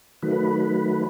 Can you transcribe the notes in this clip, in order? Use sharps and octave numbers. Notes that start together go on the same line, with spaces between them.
D#3 F#3 A3 B4